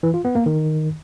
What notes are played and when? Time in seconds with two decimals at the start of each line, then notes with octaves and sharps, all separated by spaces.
0.03 E3
0.14 F4
0.25 B3
0.35 A#3
0.46 D#3